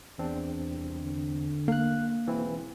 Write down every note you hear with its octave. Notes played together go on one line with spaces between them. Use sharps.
E2 C4 D4
C2
D3
A#3 F5 F#6
E1 E3 C4 E4